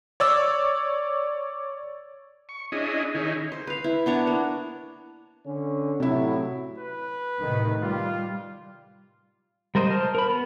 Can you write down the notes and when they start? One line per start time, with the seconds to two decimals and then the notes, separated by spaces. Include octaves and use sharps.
0.20 C#5 D5 E6
2.49 C#6
2.72 C#4 D4 E4 G#4 D#5
3.15 D#3 C#4 D#4 E4 G#4
3.52 C5
3.67 B4 F5
3.84 E4
4.06 B3 D4 C#5 A#5
4.27 A#3
5.46 D3 C#4
6.00 A2 C3 F#3 E4
6.78 B4
7.41 A2 C3 D#3
7.82 G3 F4
9.75 G3 A#4 C5 D#5
9.90 C5 A5 F6
10.15 A#4 B5
10.28 B3